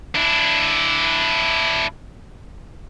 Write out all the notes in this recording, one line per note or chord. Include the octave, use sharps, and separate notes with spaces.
D4 E4